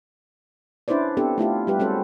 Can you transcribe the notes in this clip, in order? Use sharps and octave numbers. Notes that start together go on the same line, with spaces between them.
C#4 D4 E4 B4 C5 D5
B3 C4 D4 G4 A4
A3 E4 F4 G4
G3 G4 B4
G#3 C4 C#4 F#4 A4 C5